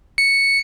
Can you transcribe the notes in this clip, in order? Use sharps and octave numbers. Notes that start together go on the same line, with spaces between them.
C#7